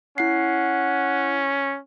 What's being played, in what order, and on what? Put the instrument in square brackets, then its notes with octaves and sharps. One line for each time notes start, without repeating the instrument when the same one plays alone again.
[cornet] C#4 [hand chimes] E4 C7 [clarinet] F#5